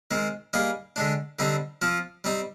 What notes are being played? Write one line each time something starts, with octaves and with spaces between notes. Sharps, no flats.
D#3 G#3 C4
G3 A#3 D#4 G#4
D3 G#3 D4
D3 G3 C4 D#4
F3 C4 F4
G3 C4 D#4